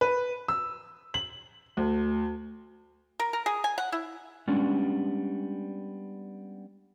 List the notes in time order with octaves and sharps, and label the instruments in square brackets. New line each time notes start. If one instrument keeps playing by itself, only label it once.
[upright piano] B4
E6
F#7
D2
[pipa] A#4
A#4
G#4
G#5
F#5
E4
[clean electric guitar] G3 G#3 B3 C#4 D4